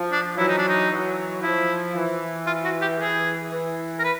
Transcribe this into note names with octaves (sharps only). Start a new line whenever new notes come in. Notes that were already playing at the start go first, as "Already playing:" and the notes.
Already playing: F3
D4
E3 F#3 E4
D#4
D4
D#4
E3 F#3
F3 E4
E3
F4
F#4
G4
E3 G#4
E3
A#4
B4